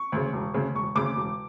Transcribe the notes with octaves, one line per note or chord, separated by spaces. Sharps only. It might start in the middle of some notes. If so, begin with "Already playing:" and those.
Already playing: C#6
D2 C#3
E1
D2 C#3
E1 C#6
D2 C#3 D6
E1